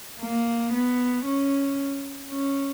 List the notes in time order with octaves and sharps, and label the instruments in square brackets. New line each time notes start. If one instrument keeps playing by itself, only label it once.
[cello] A#3
B3
C#4
C#4